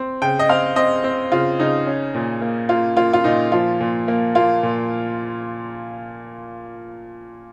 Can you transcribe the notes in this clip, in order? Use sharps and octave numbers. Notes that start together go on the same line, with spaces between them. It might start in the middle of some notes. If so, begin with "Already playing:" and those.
Already playing: C4
C#3 G5
D#5
C4 F5
C4 D#5
C4
C#3 F4
C#3 D#4
C#4
A#2
A#3
A#3 F4
A#3 F4
F4
A#2 D#4
F3 F4
A#2
A#3
A#3 F4
A#2